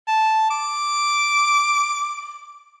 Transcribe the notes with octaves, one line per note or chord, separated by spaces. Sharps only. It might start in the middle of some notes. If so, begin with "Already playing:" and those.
A5
D6